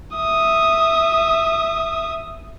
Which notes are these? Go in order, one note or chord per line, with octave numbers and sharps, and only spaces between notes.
E5 D#6